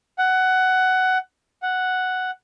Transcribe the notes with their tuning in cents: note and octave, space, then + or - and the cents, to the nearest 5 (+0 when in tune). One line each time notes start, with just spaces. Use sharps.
F#5 +15
F#5 +0